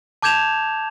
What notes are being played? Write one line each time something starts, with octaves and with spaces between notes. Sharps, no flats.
A5 D6 G6 G#6 E7 F7